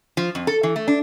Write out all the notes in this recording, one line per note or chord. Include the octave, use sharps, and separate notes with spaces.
F3
F2
A4
E3
A3
D4